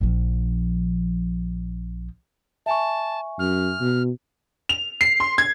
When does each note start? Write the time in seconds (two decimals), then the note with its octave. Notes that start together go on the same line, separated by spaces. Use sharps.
0.01 A#1 F3
2.66 E5 G#5 A5 C#6
3.39 F#2 F6
3.80 B2
4.69 F7
5.01 C7
5.20 C6
5.38 G#6